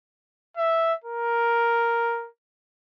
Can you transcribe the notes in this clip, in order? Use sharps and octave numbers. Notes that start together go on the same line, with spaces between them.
E5
A#4